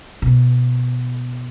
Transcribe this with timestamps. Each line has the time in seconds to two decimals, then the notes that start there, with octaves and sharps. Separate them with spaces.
0.22 B2